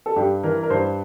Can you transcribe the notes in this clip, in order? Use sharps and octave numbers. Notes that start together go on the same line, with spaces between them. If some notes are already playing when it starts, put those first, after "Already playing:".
A4
G2 G4
E3 A#4
A#4
G2 C5